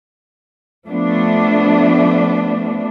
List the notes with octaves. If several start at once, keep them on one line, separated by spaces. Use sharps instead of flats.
F3 A3 B3 D4